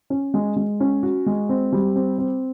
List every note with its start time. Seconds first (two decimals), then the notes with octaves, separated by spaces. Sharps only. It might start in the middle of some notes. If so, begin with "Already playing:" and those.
0.10 C#4
0.34 G#3
0.56 G#3
0.80 C#4
1.03 F#4
1.26 G#3
1.49 C4
1.73 G3
1.96 C4
2.18 C4